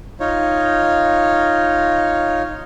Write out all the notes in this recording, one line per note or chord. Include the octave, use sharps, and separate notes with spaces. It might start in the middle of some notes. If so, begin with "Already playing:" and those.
D#4 F4 C#5